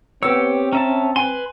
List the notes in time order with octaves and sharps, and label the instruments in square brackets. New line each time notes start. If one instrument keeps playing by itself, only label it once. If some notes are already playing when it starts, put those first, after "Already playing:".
[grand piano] B3 E6 [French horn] C4 [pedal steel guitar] G4 C#5
[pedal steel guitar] C#4 E5 A5 [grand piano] A#5
[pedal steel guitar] B4 C6 [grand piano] G#5 D#7